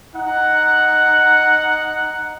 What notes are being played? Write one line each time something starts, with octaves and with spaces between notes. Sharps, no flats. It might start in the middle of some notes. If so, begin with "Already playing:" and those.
D#4 F#5